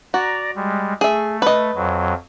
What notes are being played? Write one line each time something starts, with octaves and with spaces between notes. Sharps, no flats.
F#4 D5 A#5
G3 G#3
A3 G#4 E5
B4 D#5
F2 F#3